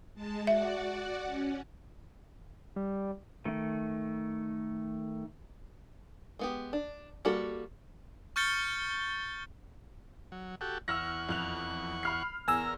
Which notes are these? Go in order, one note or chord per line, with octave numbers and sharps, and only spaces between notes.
G#3 A5
F#4 D5 E5 F#5
C#4
G3
D#3 A3
G#3 B3 G4
D4
G3 A#3 F#4 A4
C#6 F6 G6 A6 C#7 G7
F#3
F#4 G4 A4
E2 F#5 C#6 E6 F6 A#6
F2 F#6 F7
B5 F6 C7
E2 A#4 G#5 A#5 E6